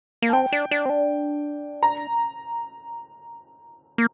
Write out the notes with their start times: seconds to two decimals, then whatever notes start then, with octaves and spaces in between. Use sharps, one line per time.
0.22 A#3
0.29 A5
0.33 C4 G5
0.52 D4
0.71 D4
0.86 C4
0.89 D4
1.83 A#5
3.98 A#3